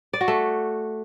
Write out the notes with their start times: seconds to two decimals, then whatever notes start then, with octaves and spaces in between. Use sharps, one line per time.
0.13 D5
0.21 F#4
0.28 A3